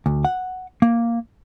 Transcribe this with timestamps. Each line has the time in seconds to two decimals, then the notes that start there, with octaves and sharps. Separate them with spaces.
0.06 D2
0.25 F#5
0.82 A#3